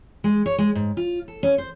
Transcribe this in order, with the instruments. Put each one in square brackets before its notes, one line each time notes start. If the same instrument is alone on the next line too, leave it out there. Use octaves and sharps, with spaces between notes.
[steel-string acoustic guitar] G#3
C#5
G#3
G#2
F4
A4
C#4
C5